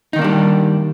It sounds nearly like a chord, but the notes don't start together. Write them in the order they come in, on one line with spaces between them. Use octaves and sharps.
D#4 D#3 A#3 D4 G3